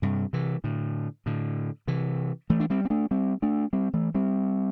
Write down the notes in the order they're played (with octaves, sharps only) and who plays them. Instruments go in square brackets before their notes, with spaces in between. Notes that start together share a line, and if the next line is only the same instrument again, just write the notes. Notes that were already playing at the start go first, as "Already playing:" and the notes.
[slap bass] G2 C3
C3 E3
A2 D3
A2 D3
C3 E3
E3 A3
D4
G3 C4
C4
A3 D4
G3 C4
A3 D4
G3 C4
E3 A3
G3 C4